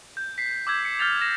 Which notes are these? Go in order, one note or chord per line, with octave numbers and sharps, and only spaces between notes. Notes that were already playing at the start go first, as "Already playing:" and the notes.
G6
B6 C7
D6 E6 G6 G#6
C7 C#7
F6 G6 A6 F7
A#6 E7